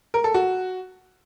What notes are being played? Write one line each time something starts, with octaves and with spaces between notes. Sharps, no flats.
A#4
A4
F#4